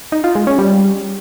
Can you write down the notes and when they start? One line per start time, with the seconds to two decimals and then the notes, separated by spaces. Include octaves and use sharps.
0.12 D#4
0.24 F4
0.35 G#3
0.47 C#4
0.59 G3